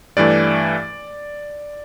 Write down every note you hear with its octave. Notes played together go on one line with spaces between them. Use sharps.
G2 E3 A3 D5